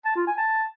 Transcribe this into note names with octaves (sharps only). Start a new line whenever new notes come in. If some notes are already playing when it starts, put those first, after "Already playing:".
A5
F4
G#5
A5